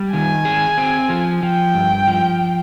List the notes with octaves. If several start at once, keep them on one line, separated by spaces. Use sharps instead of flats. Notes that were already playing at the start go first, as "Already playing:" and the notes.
Already playing: G3
D#3 G#5
G#4
C4
F3
F3 G5
G2
F3